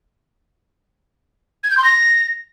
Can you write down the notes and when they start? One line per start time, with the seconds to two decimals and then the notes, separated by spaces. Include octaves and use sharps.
1.64 G#6
1.71 G6
1.77 C6
1.84 A#6